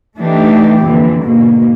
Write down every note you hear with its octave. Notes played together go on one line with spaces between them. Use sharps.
E3 A3 D4 D#4 G4
F2 A#2 D3 E3
G#2 B2 A#3